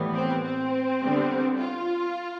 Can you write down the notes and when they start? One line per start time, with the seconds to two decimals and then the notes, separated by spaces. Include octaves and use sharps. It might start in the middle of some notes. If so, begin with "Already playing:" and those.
Already playing: A2 E3 G3 B3
0.15 C4
0.44 C4
1.01 D3 G3 B3
1.58 F4